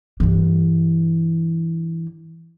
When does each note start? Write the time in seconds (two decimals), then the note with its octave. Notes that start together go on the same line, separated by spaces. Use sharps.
0.20 G2 E3